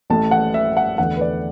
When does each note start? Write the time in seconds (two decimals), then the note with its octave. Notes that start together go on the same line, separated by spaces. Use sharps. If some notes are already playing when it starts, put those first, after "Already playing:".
0.10 A1 A2 A3 A5
0.31 F#5
0.54 E5
0.77 F#5
0.98 E2 D3 A3 F#5
1.17 B4
1.21 D5